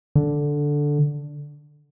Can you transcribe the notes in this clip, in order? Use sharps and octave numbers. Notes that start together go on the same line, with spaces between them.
D3